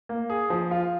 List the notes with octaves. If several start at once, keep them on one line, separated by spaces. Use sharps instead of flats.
A#3
G#4
F3
F4